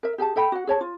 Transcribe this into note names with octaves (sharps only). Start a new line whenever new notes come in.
A#4 E5
G4 G#4 G#5 A5
A4 E5 G5 B5
F#4 F#5
G#4 C#5 A5
F4